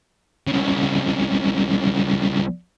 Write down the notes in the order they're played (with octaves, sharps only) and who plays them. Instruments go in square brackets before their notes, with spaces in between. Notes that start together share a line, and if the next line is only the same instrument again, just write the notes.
[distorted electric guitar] C2 C#3